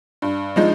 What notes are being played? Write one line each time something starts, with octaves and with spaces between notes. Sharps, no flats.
G2
F3 G#3 D#4